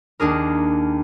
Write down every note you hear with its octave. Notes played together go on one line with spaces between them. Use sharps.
D#2 D4 G#4 A#4